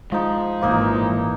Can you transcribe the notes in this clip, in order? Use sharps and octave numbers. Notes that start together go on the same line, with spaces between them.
F3 G#3 D#4
G#1 A#2 E3 F3 A#3 D#4